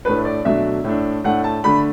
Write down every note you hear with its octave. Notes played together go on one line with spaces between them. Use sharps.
A2 A3 D4 B4
D5
B2 F#3 A3 D4 E5
A2 A3 D4
A2 A3 D4 F#5
A5
D3 A3 D4 B5